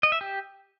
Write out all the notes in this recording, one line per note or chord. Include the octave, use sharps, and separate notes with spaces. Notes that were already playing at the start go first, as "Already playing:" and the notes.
D#5
E5
G4